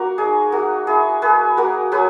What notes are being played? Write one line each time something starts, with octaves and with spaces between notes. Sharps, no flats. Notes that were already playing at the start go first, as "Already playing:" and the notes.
Already playing: A#3 F#4 A#4
D#4 G#4
A#3 F#4
E4 G#4
A#3 G#4 B4
A#3 F#4 A#4
F#3 G#4 B4